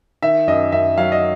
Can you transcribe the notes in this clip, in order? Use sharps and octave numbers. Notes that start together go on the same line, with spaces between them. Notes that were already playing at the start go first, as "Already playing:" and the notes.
D#3 E5
F#2 D#5
F#2 E5
F#3 F5
D#5